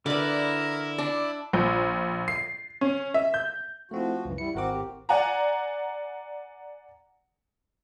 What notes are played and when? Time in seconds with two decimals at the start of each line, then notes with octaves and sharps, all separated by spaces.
0.06 D3 E4 A#4 B4 D5
0.98 D4 D5
1.53 A#1
2.28 C7
2.81 C#4
3.14 E5
3.34 G6
3.91 F3 A3 C4 E4 F#4
4.25 C#2 F#2 E3
4.38 G3 E4 C#7
4.55 G#1 C4 F#4 A#4 F#5 D6
4.73 A2 C4 G4
5.09 D5 F#5 G#5 A#5